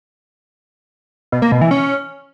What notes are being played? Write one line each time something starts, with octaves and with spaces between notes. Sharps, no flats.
B2
A#3
B2
E3
C#4